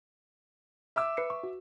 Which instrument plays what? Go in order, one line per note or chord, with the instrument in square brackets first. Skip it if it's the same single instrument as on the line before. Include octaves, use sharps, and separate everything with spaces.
[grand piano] E5 D6 E6
[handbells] B4 C7 C#7
C#6
F#4